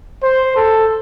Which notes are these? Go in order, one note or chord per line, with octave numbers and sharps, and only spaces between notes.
C5
A4